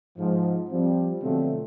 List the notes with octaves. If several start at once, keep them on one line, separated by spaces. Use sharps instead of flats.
G#2 F3
F3 G3 C4
B2 D3 F3 F#3 A3 C4